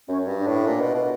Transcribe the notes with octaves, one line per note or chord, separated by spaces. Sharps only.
F#2 C#4
G2
D4
A2
A#2
B2
B2